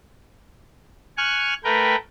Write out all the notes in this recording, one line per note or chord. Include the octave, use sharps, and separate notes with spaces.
G#5 C#6 F6 F#6
A3 A#4 B4 G5